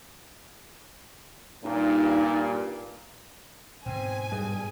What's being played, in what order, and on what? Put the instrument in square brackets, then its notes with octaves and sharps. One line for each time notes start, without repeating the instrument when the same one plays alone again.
[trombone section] G2 A#2 [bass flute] D#4
[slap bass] G#2 B2 [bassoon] C4 [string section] G#5
[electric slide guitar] G2 [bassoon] G#4